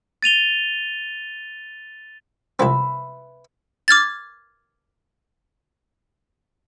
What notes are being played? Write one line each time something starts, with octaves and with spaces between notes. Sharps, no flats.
A6 D#7 F7 G7
C2 F2 C4 B4 E5
D6 F6 G#6 A6